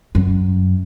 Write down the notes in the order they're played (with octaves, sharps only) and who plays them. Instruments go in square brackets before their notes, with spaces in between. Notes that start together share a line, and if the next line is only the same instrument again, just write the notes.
[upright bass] F#2